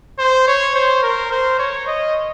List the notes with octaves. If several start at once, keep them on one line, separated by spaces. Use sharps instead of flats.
C5
C#5
C5
A#4
C5
C#5
D#5